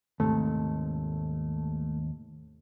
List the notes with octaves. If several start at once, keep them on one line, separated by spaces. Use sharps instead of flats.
D#2 G#2 C3 A3